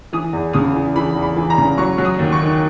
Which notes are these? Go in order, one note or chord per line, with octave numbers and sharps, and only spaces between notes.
E3 D#6
E2
C#3 D#6
E3
E3 B5
E2
B5
E3
A#5
C#3
F#3 C#6
F#3
D#6
D#2
C#6
D#3